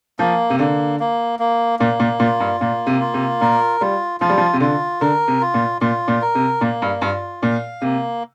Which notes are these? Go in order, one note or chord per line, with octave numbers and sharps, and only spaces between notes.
F3 A#3
C3
D3 A#3
A#3
A#3
A#2 A#3
A#2
A#2 F4
G2
A#2 A#3
C3
F4
C3
A#2 A#4
G3 F4
F3 F4
G3
F3
C3
D3 F4
D3 A#4
C3
F4
A#2
A#2 F4
A#2
A#4
C3
A#2 A#3
G2
G2 F4
A#2 F5
C3 A#3